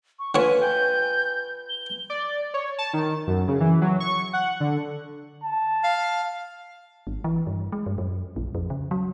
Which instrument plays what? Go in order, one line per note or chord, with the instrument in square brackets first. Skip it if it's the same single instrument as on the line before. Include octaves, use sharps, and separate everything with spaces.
[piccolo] C#6
[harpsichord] D3 C#5 [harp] F4 B4 [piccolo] G#5
[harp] G5 G#5 [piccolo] G6
[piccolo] G7
[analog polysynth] D5
C#5
A5
D#3
F#2
C#3
E3
F#3
C#6
F#5
D3
[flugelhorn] A5
[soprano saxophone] F5
[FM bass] G#1
E3
G2
G#3
G2
F#2
A#1
F2
C#3
F#3